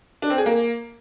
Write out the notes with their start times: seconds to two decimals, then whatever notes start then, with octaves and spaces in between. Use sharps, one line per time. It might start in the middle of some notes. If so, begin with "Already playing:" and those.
0.22 D4
0.30 C4
0.38 G#4
0.46 A#3